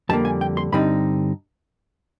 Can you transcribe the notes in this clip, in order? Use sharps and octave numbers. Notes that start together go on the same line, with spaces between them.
F2 D3 G3 A#3 A5
G#5
G5
C6
G2 D3 G3 C4 D#4 B5